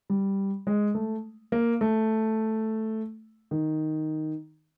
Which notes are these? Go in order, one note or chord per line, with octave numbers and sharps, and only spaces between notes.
G3
G#3
A3
A#3
A3
D#3